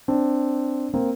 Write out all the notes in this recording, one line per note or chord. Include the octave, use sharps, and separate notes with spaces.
C4 D4
A#3 C4